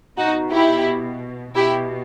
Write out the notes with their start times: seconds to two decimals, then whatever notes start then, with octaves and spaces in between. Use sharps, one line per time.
0.18 B2 D#4 F#4
0.52 E4 G4
1.55 B2 E4 G4